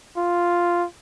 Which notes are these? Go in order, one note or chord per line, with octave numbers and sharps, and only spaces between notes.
F4